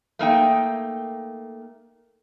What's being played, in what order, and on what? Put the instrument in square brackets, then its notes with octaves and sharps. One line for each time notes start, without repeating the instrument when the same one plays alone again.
[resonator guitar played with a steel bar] A3 A#3 D#4 G5